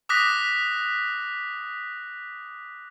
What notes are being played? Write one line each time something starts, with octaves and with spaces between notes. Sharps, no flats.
D6 D#6 F#6 A#6 B6